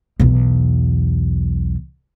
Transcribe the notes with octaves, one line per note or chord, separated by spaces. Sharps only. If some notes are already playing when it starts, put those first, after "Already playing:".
B1 E2